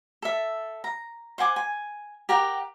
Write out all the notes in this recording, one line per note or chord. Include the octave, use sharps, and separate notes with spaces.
A4 E5
A#5
C5 F#5 G#5 D6
G#5
G4 A#4 F#5 G5